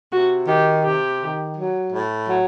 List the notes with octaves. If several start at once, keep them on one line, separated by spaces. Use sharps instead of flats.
C3 F#4
D#3 G4
C3 G4
D#3
F#3
A2
F#3